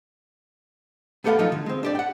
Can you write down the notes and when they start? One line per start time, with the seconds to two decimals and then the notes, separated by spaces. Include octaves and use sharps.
1.24 A3 B3 G4 A4 F5 F#5
1.39 F3 F#3 A3 D#4 F4
1.52 D3
1.66 G#3 C4
1.83 D4 G4 D5
1.95 F#5 G5